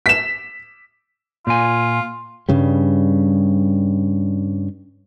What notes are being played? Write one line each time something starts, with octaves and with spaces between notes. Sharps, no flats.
B6 E7
A#2 F4 G#5
G2 C#3 G3